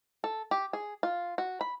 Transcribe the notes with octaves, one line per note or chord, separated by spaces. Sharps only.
A4
G4
G#4
F4
F#4
B5